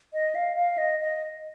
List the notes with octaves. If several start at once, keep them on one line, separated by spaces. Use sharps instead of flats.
D#5
F5
F5
D#5
D#5